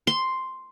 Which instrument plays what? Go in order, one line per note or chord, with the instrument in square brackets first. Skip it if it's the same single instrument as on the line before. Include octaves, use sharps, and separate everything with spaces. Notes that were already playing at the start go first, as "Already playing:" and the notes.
[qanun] C6